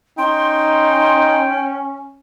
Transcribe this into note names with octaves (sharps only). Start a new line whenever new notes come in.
C#4 D#4 G5 C6